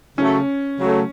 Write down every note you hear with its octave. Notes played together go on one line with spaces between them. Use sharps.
C#3 F#3 A3 C#4
C#3 F#3 A3